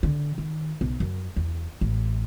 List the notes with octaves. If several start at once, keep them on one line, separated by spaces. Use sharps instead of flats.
D3
D#3
B1
F#2
E2
A1